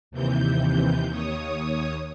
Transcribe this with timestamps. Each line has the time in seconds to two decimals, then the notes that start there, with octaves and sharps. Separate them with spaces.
0.11 D#2 C3 E3 G6
1.08 D#2 C#5 D#6